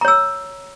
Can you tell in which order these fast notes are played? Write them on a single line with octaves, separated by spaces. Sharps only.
A#5 C#5 E6